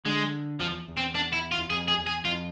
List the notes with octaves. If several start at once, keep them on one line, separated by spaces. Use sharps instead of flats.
D3 G#3
F2 F3
E2
E2
C4
D4
E4
F4
E2
F2 G#4
G#4
E2
G#4
F2 F4